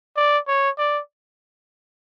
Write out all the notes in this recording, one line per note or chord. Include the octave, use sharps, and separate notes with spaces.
D5
C#5
D5